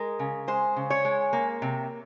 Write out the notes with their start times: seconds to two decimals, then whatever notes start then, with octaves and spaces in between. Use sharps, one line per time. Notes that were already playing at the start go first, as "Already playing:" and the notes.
Already playing: G#3 A#4
0.19 C#3
0.48 G#3 C5
0.76 C#3
0.90 C#5
1.05 G#3
1.33 A#3
1.62 C3